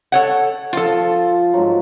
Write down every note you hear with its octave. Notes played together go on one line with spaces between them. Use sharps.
A4 C#5 F#5
F3 F4 A4
G#2 F#3